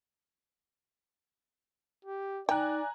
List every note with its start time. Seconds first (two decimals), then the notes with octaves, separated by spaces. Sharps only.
2.05 G4
2.49 D#4 D5 G5 G#5 A#5 F#6